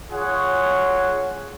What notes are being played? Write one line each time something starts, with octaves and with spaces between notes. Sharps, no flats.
F4 G#4 C#5 F#5